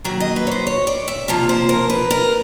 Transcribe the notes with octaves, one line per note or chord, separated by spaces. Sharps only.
D#3 F#3 A#3 E5
D#5
B4
C#5
C5
C#5
D5
E5
C3 F3 A#3 F5
C5
A#4
B4
A#4